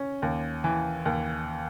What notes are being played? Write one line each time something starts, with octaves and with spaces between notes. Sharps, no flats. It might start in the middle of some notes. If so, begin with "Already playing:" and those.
Already playing: C#4
D#2
E3
D#2